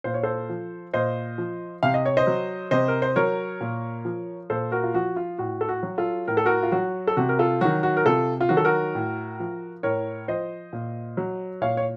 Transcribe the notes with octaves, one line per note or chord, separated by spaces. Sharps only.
A#2 C5
C#5
A4 C5
F3
A#2 C5 D#5
F3
C3 F5
D#5
C#5
C5 D#5
F#3
C3 C5 D#5
A#4
C5
F#3 A#4 C#5
A#2
F3
A#2 A4 C5
F#4 A#4
F4
F3 F#4
F4
A2 F#4
A4
F#4
F#3
F4 A4
A2 A#4
A4
F#4 A#4
F4
F#3 F#4
A4
C3 F#4
A#4
F4 A4
D#3 F#3 F#4
F#4
A#4
C3 F4 A4
F4
D#3 F#3 F#4
A4
F#4 A#4
A2
F3
A2 A#4 C#5
F3 C5 D#5
A#2
F#3
A#2 C#5 F5
C#5